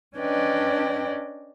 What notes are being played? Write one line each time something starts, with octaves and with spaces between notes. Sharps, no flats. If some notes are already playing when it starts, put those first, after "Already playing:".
C#4 D4 B4 D5 D#5 G5